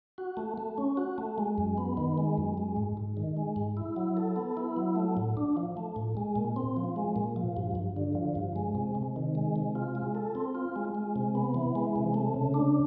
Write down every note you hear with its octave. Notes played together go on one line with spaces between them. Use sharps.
F#4
A3
A3
C#4
F#4
A3
G#3
F#2
B3
D#3
G#3
F#2
G#3
G#2
G#2
D#3
G#3
G#2
E4
F#3
A4
B3
E4
F#3
A3
A2
D4
F3
A3
A2
G#3
A#2
C4
F3
G#3
A#2
F3
G2
G2
D3
F3
G2
G#3
C3
C3
D#3
G#3
C3
F4
G#3
A4
C4
F4
G#3
G#3
C3
B3
E3
G#3
C3
A3
C#3
D4